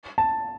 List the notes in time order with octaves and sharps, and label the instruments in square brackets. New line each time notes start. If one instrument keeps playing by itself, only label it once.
[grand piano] A5